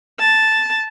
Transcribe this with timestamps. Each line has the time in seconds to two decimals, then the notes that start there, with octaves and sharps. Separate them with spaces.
0.19 A5